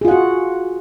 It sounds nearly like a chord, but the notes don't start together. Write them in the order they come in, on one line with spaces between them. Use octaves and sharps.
G#4 F4 F#5 F#4